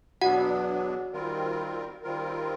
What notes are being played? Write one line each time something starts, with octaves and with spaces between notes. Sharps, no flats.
E2 B2 F#3 B3 D4 F#4 F#5
D#3 G3 C4 F4 A#4
D#3 G3 C4 F4 A#4